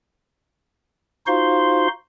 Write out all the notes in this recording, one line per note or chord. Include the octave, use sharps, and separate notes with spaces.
D#4 F4 F#4 C5 F5 C6